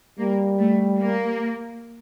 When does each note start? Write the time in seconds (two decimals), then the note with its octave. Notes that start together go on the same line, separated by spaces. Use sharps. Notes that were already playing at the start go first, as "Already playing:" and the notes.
0.19 G3 A#3
0.60 A3
1.00 A#3